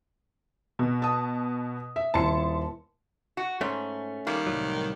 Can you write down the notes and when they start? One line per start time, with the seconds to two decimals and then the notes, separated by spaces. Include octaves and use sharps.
0.79 B2
1.02 A5 D#6
1.96 E5
2.14 D#1 E4 A5 C6 C#7
3.37 F#4
3.61 G#2 A3 C#4
4.27 D#3 G3 A#3
4.47 C2 A2 F#3